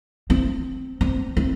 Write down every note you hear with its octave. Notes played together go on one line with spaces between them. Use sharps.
C4
C4
C4